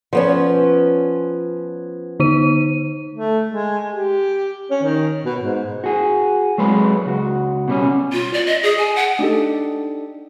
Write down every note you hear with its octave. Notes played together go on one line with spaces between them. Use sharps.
F3 B3 C#4
D3 D#4 D#7
A3
G#3
G4
C#4
D#3
B2
G#2
F#4 G#4
F#3 G#3 B4
C#2 F#4
B2 G3 C#4
F4
D5
D#5
G#4
G#5
F#5
D4 D#4 G4 A4